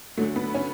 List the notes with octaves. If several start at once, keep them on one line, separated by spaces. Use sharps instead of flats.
D2 D3 F#3 A3
B3
C#4